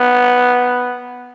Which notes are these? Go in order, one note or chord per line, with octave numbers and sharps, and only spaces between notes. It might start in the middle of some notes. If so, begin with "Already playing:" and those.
Already playing: B3